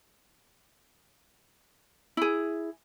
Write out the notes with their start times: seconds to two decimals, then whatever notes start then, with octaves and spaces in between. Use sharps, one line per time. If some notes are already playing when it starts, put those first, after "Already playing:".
2.17 E4 G#4